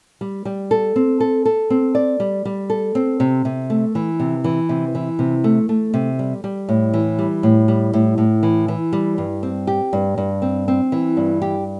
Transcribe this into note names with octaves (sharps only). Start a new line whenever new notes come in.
G3
G3
A4
C4
A4
A4
C4
D5
G3
G3
A4
C4
C3
C3
A3
E3
C3
E3
C3
E3
C3
A3
A3
C3
G3
G3
A2
E3
G3
A2
G3
A2
A2
E3
E3
G3
G2
C4
G4
G2
G2
C4
C4
E3
G2
G4